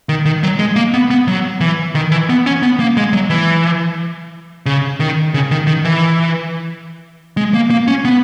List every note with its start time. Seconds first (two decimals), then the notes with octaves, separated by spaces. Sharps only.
0.09 D#3
0.25 D#3
0.43 F#3
0.59 G#3
0.76 A#3
0.94 B3
1.11 B3
1.28 F#3
1.61 E3
1.95 D#3
2.11 E3
2.29 B3
2.46 C#4
2.63 B3
2.80 A#3
2.97 G#3
3.13 F#3
3.30 E3
4.66 C#3
5.00 D#3
5.34 C#3
5.51 D#3
5.67 D#3
5.85 E3
7.37 G#3
7.54 A#3
7.70 A#3
7.88 C#4
8.05 B3